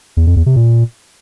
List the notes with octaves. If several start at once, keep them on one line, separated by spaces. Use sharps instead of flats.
E2
F2
E2
C3
A#2